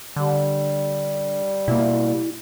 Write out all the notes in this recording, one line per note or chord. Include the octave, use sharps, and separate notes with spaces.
D3 G3
B2 A#3 E4